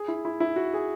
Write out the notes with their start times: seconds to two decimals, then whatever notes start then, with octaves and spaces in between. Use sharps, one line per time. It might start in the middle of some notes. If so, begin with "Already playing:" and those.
Already playing: G#4
0.08 E4
0.25 E4
0.40 E4
0.56 F#4
0.74 G#4